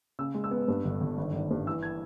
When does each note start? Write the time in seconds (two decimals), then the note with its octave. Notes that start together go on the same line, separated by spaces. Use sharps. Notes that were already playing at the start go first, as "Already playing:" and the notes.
0.19 C#3 E6
0.35 G#3
0.44 E6
0.51 B3
0.68 G2
0.85 G1
1.01 G1
1.18 G#1
1.34 G#1
1.51 G2
1.66 E3 E6
1.83 G#6